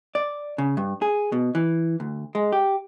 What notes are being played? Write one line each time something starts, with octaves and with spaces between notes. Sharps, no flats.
D5
C#3
G2
G#4
B2
E3
D2
G#3
G4